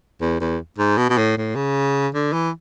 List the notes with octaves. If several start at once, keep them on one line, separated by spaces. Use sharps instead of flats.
E2
E2
G#2
B2
B2
A2
A2
C#3
D3
E3